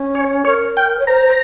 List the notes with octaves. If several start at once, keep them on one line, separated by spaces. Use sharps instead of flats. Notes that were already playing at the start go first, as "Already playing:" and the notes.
Already playing: C#4
C#5
A#4 C#5
G5
C#5
C5 A#5
C5